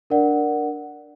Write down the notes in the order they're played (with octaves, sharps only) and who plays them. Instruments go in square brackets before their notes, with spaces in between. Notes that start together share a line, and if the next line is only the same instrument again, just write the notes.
[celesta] D4 A#4 D5 F#5